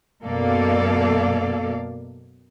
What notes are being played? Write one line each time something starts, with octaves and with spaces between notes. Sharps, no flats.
F#2 B2 A#3 A4 D5 F5